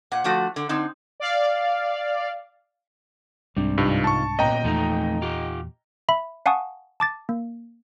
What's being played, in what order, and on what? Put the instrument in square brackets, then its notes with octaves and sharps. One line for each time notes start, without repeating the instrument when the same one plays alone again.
[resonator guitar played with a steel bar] A#2 F#5
D3 F3 A3 F#4
D3
D3 C4 D#4
[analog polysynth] D5 F5
[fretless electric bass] C2 G#2 D4 [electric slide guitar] G3 C4
[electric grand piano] G2 [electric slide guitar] C3 D#4 F4
[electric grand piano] A5 C#6
[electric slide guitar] A#2 B3 C#4 [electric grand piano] D#5 G5 A#5
[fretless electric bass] E2 A#2 [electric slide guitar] F3 A3 D#4
[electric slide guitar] F4 G4
[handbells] E5 B5
F5 F#5 G#5 A5 C#6 D#6
A5 D6 A6
A#3